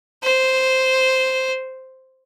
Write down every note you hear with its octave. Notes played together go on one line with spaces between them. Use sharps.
C5